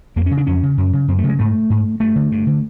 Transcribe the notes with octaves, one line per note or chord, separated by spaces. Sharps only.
F2 A#3
C#4
C#3
D4
F2 C#4
C#3
F#2
C#3
F#2 C4
A3
C#3
G#3
G#2 A3
G#2
G2 A3
D3
G2
D3